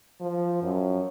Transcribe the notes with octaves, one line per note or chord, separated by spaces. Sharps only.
F3
F#2